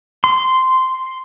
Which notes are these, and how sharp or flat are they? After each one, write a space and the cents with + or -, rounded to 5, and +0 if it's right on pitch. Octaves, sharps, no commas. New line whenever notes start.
C6 -10